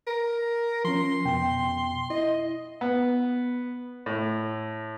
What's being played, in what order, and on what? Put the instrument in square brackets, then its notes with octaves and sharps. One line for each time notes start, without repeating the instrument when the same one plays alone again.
[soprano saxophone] A#4
[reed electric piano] F3 C#4 [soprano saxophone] C6
[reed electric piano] F2 B2 G5
[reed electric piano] E4 [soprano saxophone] D#5
[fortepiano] B3
A2